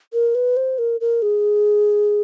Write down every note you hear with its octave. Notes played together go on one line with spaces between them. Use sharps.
A#4
B4
C5
A#4
A#4
G#4